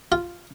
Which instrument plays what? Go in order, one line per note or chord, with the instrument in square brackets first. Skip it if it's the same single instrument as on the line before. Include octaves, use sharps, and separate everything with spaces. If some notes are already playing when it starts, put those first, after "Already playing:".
[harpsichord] F4